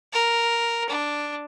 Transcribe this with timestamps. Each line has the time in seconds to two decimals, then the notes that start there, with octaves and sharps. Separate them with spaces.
0.13 A#4
0.89 D4